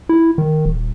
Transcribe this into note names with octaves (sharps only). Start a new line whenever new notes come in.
E4
D#3
D#1